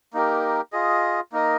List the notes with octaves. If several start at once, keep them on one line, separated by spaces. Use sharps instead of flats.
A#3 D#4 G4 A#4
F4 G#4 D#5
A#3 D#4 A#4 D#5